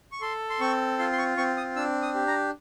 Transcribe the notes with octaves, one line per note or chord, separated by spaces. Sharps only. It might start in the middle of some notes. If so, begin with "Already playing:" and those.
C#6
A4 C6
C6
C4 C#6
F4 C6
C6
C#6
C4 C#6
D#6
D4 E6
D#6
G4
A#5